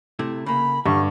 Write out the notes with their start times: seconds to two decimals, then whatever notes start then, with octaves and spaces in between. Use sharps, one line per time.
0.19 C3 A3 E4
0.46 C#3 A#3 B5
0.86 G2 D3 G3 C#6